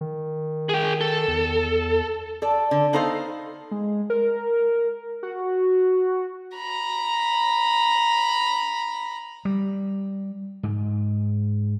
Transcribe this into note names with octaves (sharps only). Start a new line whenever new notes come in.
D#3
G#4 G5
A4
E2
A4 D5
D3
B3 D#4 A4 C5 F5
G#3
A#4
F#4
A#5 B5
G3
G#2